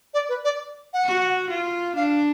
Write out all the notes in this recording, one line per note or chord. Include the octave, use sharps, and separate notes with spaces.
D5
B4
D5
F#5
F#4
F4
D4 F5